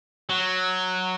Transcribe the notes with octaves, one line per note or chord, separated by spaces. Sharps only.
F#3